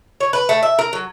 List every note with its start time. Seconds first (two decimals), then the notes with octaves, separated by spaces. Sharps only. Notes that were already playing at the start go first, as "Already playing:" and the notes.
0.20 C#5
0.33 B4
0.49 A3
0.63 E5
0.79 A#4
0.93 F#3